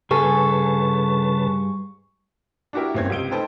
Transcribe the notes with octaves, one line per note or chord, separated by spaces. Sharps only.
G2 C#3 G#4 A4 B4 G#5 A5 C#6
D4 E4 F#4 G4 A#4 E5
G1 A#3 C4 C#4 G#6
C#2 C3 D7 G7
A3 D#4 A4 B4 C5 G5